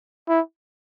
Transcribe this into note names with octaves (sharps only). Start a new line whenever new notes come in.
E4